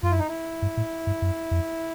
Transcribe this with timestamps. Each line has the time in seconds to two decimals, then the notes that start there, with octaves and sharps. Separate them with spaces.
0.03 F#2 F4
0.11 E4
0.19 D#4
0.28 E4
0.62 G2
0.77 A2
1.07 G2
1.22 F#2
1.51 F2